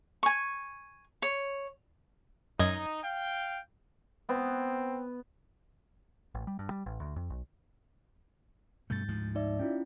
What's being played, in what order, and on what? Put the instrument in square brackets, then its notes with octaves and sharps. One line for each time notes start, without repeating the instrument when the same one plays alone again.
[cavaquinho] G#5 C#6
C#5
[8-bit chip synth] F#2 D#5 G#6 [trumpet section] D#4
[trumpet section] F5 G5
[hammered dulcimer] B3 [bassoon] C4
[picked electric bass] A1
G3
G2
G3
A1
D2
F2
B1
[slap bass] G2 B2 A3 [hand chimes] G6 A6
[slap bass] D2 G#2 F3
[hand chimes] D#4 D5 E5
C#4 E4 F4